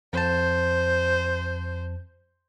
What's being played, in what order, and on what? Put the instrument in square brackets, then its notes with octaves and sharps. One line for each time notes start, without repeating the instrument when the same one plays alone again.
[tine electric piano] F2 A5 [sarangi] C5